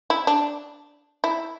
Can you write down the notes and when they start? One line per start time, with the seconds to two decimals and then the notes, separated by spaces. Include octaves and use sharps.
0.10 E4
0.27 D4
1.24 E4